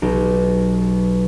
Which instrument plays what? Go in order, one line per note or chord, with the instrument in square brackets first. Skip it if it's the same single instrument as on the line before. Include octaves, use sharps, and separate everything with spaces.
[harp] B1 G4